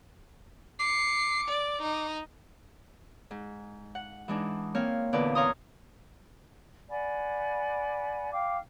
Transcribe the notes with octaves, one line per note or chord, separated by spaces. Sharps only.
D6 C7 C#7
D5
D#4
G#2
F#5
E3 G#3 D4 D#4
A#3 C4 C#5 F5
E2 A#2 D3 B4 D5
C#5 F5 A#5 C6 D#6
D5 F#5 G#5 B5
F5 G5 D6